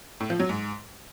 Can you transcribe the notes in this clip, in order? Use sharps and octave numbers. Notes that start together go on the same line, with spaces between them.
A2
F3
F#3
G#2